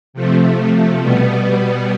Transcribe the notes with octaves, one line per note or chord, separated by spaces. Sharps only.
C3 F3 A3
B2 G3 B3